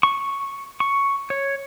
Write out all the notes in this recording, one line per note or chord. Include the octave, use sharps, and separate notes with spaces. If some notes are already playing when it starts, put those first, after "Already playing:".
C#6
C#6
C#5